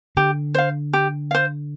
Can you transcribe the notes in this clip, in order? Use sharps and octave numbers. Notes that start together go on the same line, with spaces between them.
D3 G4
C5 F5
G4
C5 F5